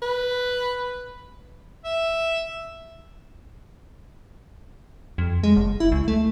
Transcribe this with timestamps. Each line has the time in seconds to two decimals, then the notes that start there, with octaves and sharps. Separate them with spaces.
0.02 B4
1.85 E5
5.18 F2
5.43 G#3
5.56 F#1
5.80 E4
5.92 C#2
6.08 A3